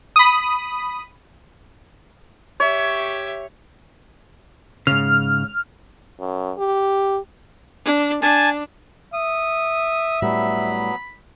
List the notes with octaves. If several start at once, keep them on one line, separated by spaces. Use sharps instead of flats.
B5 D#6
G4 C#5 E5
G#2 C#3 F6
F#2
G4
D4
D4 G#5 A5
E5 D#6
A2 F#3 G3 B3 B5